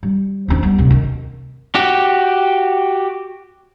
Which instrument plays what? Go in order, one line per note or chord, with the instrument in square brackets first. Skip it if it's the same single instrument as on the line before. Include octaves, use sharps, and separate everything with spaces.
[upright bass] G3
D#2 C4
G3 B3
D1 C3
D#3
[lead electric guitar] F#4 G4